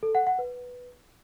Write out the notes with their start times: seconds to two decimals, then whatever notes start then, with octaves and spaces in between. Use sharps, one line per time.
0.03 A4
0.15 F#5
0.27 F#5
0.39 B4